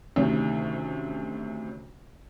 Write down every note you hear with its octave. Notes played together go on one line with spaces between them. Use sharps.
D2 C3 D#3 C#4